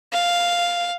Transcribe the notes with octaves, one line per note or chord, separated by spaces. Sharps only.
F5